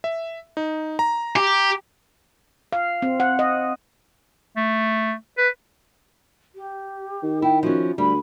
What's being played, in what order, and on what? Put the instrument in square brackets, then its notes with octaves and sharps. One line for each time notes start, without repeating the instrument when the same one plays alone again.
[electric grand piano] E5
D#4
A#5
[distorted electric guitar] G4
[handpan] F5
C4
F#5
D#5
[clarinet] A3
B4
[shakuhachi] G4
[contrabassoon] D#3
[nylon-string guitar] E4 [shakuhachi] G5
[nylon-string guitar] F3 C#4 [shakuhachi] F#4
[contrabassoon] D2 [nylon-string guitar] G3 [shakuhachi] B5